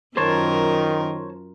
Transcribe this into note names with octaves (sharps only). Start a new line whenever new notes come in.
F#2 D#3 F4 A#4 C5 C#5 A5